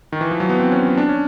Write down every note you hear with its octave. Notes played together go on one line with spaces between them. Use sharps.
D#3
E3
F3
F#3
B3
C4
C#4
D4
C#4